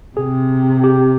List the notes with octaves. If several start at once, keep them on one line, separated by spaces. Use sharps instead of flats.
C3 G#4
G4